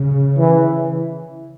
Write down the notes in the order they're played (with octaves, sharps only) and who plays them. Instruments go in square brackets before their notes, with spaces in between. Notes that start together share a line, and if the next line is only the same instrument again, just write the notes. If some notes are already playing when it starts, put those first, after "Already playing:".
Already playing: [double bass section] C#3
[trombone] E3